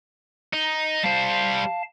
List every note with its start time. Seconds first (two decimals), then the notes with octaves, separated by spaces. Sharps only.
0.53 D#4
1.03 G3 C5 F5 A5